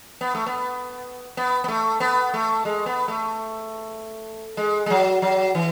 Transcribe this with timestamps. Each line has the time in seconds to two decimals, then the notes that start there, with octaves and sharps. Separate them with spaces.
0.21 B3
0.35 A3
0.46 B3
1.37 B3
1.64 B3
1.68 A3
2.00 B3
2.34 A3
2.65 G#3
2.86 B3
3.08 A3
4.57 G#3
4.86 G#3
4.90 F#3
5.22 F#3
5.55 E3